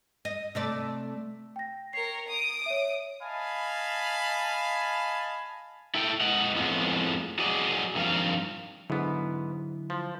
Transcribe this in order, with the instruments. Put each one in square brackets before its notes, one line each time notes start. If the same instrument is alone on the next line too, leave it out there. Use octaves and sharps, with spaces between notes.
[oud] D#5
C3 A3 D5
[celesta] G5 A#6
[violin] A#4 C#5 [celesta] C7
[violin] D#6 D7
[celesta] C#5 E5
[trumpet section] D#5 F5 G#5 A5 B5
[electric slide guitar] E4 A4 G5
G#3 D#5 F#5
F2 A2 F3 G#3 B3
F#3 F#4 G#4 D5 D#5
G2 D#3 F3 C4 F5
[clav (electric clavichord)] G#2 B3 [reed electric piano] D3 F#3 E4
[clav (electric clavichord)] F3